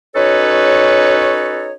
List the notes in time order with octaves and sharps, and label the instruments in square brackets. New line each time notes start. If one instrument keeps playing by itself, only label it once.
[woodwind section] C#4 D#4 F#4 A4 B4 C#5